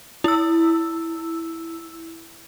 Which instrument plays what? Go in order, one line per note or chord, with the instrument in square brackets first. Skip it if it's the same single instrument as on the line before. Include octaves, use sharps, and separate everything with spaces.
[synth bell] E4 E6